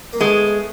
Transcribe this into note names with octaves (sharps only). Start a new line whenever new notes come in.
A#3
G#3 A3 B3